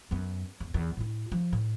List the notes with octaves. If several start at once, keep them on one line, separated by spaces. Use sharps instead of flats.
F#2 B3
E2
E2 E4
A2 E4
F3
A2